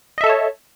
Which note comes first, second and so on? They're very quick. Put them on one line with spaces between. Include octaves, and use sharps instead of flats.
D#5 E5 A4 A5 C#5